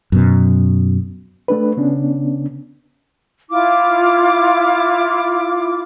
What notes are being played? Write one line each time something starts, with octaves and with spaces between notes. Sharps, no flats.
F#2 B2
A3 D4 B4
C#3 B3 C#4 D4
E4 F4 D6